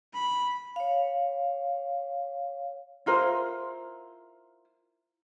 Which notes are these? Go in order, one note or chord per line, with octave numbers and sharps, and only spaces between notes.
B5
C#5 F5
E4 F4 A#4 C5